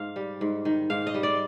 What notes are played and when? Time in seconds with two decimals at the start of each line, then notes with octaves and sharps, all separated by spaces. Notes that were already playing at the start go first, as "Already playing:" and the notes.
Already playing: G#2 F5
0.16 G3
0.41 G#2
0.65 D#3
0.90 G#2 F5
1.07 D#5
1.14 G3
1.23 D5